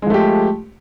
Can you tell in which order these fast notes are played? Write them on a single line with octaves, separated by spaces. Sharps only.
G#3 F3 A3 G4